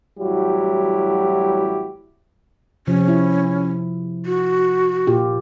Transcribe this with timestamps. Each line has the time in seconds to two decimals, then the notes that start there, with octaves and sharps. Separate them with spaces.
0.18 A1 F#3 G3 E4 F#4 G4
2.87 C3 F3 C#4
3.08 E4
4.26 F#4
5.07 A#2 F4 G4